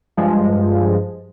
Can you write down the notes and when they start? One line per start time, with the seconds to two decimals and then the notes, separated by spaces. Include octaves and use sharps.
0.17 G2 F3 G#3